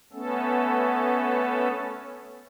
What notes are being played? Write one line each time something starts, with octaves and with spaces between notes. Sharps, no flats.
A3 B3 C#4 A4